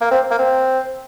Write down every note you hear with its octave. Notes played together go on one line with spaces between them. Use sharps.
A#3
C4
A#3
C4